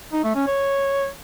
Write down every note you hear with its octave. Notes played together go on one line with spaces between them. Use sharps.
D#4
A3
C#4
C#5